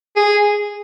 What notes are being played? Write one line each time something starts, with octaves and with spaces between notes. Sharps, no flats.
G#4